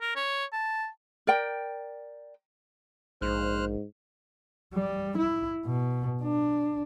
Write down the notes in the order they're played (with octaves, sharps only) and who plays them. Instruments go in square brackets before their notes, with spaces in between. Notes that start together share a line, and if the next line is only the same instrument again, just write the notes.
[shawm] A#4
C#5
A5
[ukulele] A#4 D5 G5
[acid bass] A#1 [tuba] G#2 [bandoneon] C5 F6 F#6
[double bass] G3
E4
B2
D4